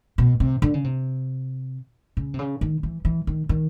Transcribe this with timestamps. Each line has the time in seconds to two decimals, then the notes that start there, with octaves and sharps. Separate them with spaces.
0.18 B2
0.40 C3
0.62 D3
0.74 C#3
0.84 C3
2.17 C#3
2.34 C3
2.39 C#3
2.61 D#3
2.83 E3
3.05 E3
3.27 D#3
3.49 D#3